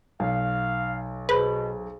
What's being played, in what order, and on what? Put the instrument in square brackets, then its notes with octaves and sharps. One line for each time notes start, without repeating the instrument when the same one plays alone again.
[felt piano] B1 [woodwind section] F5
[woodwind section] B2 [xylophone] G#4 C5 B5 [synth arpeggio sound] B4